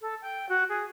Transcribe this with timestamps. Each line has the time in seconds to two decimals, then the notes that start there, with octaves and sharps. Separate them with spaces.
0.01 A4
0.22 G5
0.49 F#4
0.69 G#4